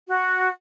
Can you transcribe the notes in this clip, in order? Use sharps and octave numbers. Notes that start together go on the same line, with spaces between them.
F#4